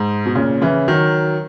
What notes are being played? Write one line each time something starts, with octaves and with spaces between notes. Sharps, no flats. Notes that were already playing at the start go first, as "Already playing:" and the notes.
Already playing: G#2
B2
A#2 C#3
C#3 E3
D#3 F#3